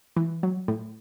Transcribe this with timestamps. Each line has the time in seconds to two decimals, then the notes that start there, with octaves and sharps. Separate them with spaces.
0.16 E3
0.43 F#3
0.68 A2